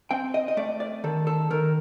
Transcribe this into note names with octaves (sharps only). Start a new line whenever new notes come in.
C4 G5
D#5
D#5
A3 D5
D5
D#3 A4
A4
D#3 A#4